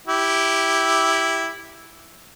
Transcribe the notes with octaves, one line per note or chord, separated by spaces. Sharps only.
E4 G4